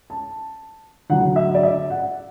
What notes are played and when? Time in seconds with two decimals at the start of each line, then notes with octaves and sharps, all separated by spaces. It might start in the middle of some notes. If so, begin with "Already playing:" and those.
0.10 A5
1.10 D2 D3 F#3 F#5
1.36 E5
1.54 D5
1.63 E5
1.90 F#5